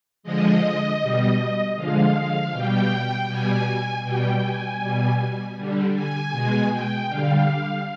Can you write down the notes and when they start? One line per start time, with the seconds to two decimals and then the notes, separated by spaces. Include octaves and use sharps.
0.23 D3 F3 G#3 D#5
1.00 B2 G3
1.76 D3 F3 G#3 F5
2.52 B2 G3 G5
3.28 B2 G3 G#5
4.04 B2 G3 G5
4.42 G#5
4.81 B2 G3
5.57 D3 G3
5.95 G#5
6.32 B2 G#3
6.70 G5
7.08 D3 G3 F5